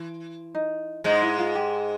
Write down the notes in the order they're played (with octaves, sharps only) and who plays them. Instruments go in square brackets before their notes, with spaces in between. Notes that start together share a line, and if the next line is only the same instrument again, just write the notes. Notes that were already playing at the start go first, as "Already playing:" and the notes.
Already playing: [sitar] E3
[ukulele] D#4
[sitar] G#2 G#3 [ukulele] D#4
[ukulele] E4
F4
G4